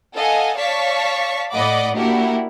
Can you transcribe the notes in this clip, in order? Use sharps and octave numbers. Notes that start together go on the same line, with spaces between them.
A4 D#5 F5 F#5 G#5
C#5 D5 F5 A5 C#6 B6
A2 D5 D#5 F#5 B5 D6
A#3 D4 E4 F#4 G4 A#4